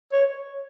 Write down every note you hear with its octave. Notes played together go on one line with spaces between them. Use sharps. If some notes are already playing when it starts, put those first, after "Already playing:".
C#5